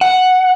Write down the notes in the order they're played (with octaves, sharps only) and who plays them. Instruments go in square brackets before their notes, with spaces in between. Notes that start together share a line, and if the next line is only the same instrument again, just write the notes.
[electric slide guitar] F#5